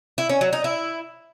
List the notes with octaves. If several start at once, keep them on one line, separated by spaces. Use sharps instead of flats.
E4
C#4
F#3
D#4
E4